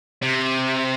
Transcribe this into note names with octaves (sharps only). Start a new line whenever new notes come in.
C3